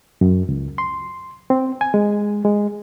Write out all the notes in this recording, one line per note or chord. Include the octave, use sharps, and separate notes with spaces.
F#2
C#2
C6
C4
G#5
G#3
G#3